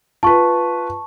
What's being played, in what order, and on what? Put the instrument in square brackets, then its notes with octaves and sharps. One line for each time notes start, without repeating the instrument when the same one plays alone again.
[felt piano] F4 B4 [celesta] A5 C#6